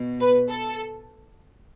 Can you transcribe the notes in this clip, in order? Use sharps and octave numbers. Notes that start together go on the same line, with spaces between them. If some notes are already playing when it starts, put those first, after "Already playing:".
Already playing: B2
B4
A4